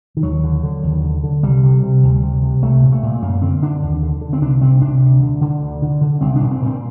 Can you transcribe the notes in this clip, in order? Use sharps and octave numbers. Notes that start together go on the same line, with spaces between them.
D#3
D#2 F#3
D3
D3
D#2
D3
D3
C2 G3
C3
C3
D2
C3
C3
C2 A3
A#2
A3
A#2
F#2 A#3
D3 C4
D3 D4
D#2
D3
D3
C4
C2 D4
C3 C4
C3 D4
D2
D3
D3
D2
D3
D3
C2 C4
D4
A#2
C4
A#2 C4